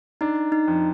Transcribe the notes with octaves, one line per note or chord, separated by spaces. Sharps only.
D4 D#4
D#4
F2